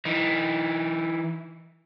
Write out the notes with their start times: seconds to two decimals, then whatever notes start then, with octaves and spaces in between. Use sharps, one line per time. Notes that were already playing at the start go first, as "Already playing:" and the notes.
0.05 E3 D#4